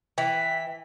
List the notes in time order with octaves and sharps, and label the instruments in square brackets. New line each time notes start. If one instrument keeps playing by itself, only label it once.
[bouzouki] E3 [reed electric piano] G5 [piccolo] B6